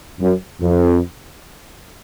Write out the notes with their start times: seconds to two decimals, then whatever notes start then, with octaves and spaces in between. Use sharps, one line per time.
0.20 F#2
0.61 F2